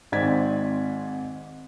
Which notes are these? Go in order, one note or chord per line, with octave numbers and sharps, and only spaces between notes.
G#1 G#2 C4 D5 G#6 B6